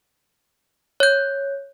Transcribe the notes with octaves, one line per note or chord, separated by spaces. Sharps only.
C#5 G6